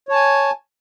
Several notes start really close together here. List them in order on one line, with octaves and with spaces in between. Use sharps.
C#5 A5 G#5